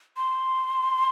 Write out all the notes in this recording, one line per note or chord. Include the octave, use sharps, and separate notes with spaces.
C6